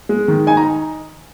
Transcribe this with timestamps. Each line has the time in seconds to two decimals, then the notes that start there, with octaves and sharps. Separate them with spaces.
0.09 G#3
0.28 D#3
0.47 D#4 G#5
0.57 A#5